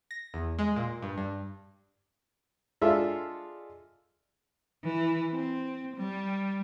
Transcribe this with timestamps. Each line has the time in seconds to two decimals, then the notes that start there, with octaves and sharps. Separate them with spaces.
0.11 A#6
0.34 E2
0.59 G#3
0.76 A#2
1.03 G2
1.18 G2
2.81 G#3 D4 F4 A4 E5 F5
4.84 E3
5.32 C4
5.96 G3